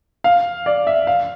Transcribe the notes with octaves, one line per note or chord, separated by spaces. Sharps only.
F5
D5
E5
F5